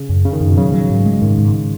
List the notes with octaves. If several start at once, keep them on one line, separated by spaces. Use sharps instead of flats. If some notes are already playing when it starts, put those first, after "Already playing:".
Already playing: C#3
F#2
C#3 C#4
D#3
F#2
B2
C#3 F#3
F#3
G#2
G#3
G#2 D#3
G#2